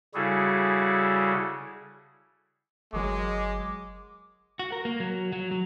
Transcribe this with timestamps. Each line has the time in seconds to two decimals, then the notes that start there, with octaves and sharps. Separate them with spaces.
0.15 C#3 G3 E4 F#4 G#4 A4
2.93 G1 F#3 G#3 A#4 C#6 D6
4.59 F#4
4.72 A#4
4.85 A#3
5.00 F#3
5.32 F#3
5.51 F#3